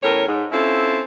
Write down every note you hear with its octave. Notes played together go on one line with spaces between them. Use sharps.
E2 A2 C#4 A#4 C#5
G#2
C4 C#4 E4 F4 A4